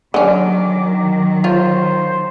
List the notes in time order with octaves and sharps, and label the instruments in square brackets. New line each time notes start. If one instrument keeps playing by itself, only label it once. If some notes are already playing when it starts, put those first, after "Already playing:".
[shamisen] D3 C#4 [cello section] D#3 F#3 [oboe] D6
[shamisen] F4 C#5 [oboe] C5